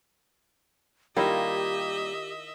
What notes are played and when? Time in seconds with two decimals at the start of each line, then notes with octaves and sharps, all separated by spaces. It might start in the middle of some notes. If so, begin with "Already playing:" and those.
1.17 D#3 G3 A#3 E4 F4 G4 D#5 E5